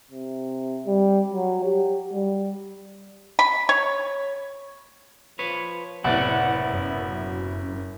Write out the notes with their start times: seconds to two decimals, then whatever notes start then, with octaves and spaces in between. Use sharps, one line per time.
0.11 C3
0.86 G3
1.33 F#3
1.65 G4
2.13 G3
3.39 B5
3.69 C#5
5.39 F3 B4 C#5
6.04 F#1 A2 C3 B3 E4 D5 F#5
6.73 F#2